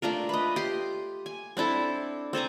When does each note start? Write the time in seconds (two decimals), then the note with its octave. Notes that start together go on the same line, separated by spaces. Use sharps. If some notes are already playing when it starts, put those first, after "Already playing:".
0.02 A3 D4 F4 A#4
0.29 B4 D#5
0.56 G4 C6
1.26 G#5
1.57 C4 D4 E4 A4
2.33 C4 A4 G#5 A#5